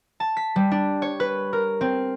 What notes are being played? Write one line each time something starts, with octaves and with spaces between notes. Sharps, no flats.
A5
B6
G3
D4
C#5
B4
A#4
C4